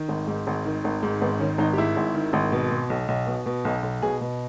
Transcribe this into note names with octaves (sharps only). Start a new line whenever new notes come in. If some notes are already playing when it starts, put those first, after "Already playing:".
Already playing: D#3
G#1
G#2
G#1
D#3
G#1
G#2
G#1 B3
D#3 C#4
G#1 D#4
G4
G#2 E4
G#1
D#3
G#1
B2
B2
B1
B1
B2
B2
B1
B1
B2 G#4
B2